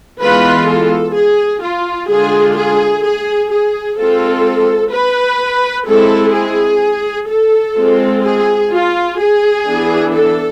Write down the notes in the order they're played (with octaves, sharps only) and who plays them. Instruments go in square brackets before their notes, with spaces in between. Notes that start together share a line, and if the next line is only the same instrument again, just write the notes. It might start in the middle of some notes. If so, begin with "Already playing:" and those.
[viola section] E3 G#3 B3 F4 B4
A4
G#4
F4
D3 G#3 D4 F4 G#4
G#4
G#4
G#4
G#3 C4 F4 A4
B4
G#3 C4 E4 A4
G#4
A4
G#3 C4 F4
G#4
F4
G#4
E3 B3 D4
A4